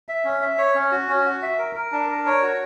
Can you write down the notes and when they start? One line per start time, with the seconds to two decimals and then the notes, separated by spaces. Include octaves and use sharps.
0.09 E5
0.25 C#4
0.41 E5
0.58 C#5
0.75 C#4
0.91 F#4
1.09 C#4
1.25 F#4
1.42 E5
1.58 A#4
1.76 A#4
1.92 D4
2.09 A#4
2.26 C#5
2.42 F#4